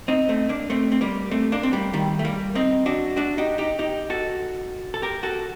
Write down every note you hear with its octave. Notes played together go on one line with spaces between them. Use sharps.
C4 D#4
A3 C4
A#3 D4
A3 C4
C4
G3 A#3
A3 C4
A#3 D4
C4
G3 A#3
D#3 G3
A3
G3 A#3
C4 D#4
D4 F#4
D4 F#4
D#4 G4
D#4 G4
D#4 G4
F#4 A4
A4
G4 A#4
F#4 A4